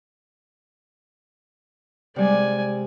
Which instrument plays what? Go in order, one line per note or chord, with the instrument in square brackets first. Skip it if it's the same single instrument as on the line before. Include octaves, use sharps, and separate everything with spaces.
[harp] C3 G3 G#3 [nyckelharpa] D5 G#5